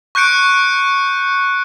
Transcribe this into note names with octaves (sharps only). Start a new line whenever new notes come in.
C#6 F#6 G6 C#7 D7